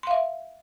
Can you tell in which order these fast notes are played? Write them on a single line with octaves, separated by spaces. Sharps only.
C6 F5 E5